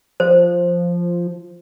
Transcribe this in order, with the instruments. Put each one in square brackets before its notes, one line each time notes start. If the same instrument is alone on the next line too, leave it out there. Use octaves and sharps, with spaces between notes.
[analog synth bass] F3 [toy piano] C5